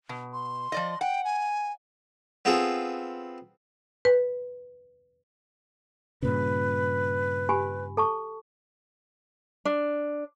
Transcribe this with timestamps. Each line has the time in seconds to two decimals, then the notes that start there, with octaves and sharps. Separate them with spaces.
0.09 B2
0.33 C6
0.72 F3 D5 D#5
1.01 F#5 G5
1.24 G#5
2.45 B3 C4 F4 G#4 A4
4.05 B4
6.23 G2 A#2 C#3 B4
7.49 G4 G#5 B5
7.97 A4 A5 C#6
9.65 D4